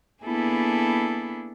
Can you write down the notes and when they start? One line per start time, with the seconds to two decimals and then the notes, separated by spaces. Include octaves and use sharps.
0.25 A#3 B3 D4 E4 G#4 A4